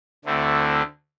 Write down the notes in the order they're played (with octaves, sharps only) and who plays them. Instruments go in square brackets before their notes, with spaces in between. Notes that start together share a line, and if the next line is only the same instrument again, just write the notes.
[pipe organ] D2 D3 A3 C4 E4